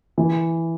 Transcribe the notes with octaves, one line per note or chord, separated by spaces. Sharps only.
E3